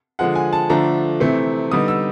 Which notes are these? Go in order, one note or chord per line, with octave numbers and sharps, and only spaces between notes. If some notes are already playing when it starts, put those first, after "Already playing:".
D3 F3 G#3 F#5
G#5
A5
D3 F3 A3 D4 A#5
C3 E3 A3 C4
D3 G3 B3 D#4 D#6
E6